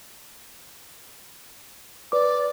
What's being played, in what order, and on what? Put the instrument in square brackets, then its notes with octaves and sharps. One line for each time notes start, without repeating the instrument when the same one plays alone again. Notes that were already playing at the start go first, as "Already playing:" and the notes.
[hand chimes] B4 D6 [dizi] D5